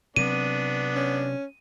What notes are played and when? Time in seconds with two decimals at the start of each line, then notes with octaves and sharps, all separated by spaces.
0.16 C3 F#3 B3 C4 D4 D#7
0.96 C#4